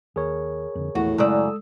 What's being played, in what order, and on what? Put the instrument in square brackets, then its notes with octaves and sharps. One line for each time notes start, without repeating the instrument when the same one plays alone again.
[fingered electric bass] D#2 [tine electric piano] G#4 A#4 C#5
[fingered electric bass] F2 D3
[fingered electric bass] A#1 E2 [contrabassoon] A2 [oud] F#4
[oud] F#2 C#3 D5 [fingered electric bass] G#3 [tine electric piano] A4 D#6 E6